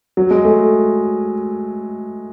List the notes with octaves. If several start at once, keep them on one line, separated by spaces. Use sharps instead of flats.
F#3
G#3
A3